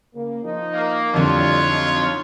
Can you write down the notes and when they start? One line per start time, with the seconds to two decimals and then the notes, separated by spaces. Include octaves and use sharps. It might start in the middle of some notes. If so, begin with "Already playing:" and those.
0.14 C#3 A#3
0.43 F3 D#4
0.74 A#3
1.14 F2 A2 D3 G3 F4 C#5
1.66 F#3 D#4